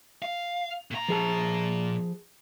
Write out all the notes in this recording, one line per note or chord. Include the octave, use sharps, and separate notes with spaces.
F5
A#2 A#5
F3 G#4 A5